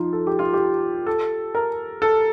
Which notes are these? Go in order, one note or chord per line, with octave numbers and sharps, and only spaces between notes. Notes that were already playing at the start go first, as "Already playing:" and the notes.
Already playing: F3 D#4 F4
A4
G4
F4
G4
A4
A#4
A4